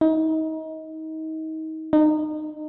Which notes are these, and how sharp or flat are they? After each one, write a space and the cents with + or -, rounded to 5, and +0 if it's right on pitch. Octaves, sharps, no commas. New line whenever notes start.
D#4 +30
D#4 -25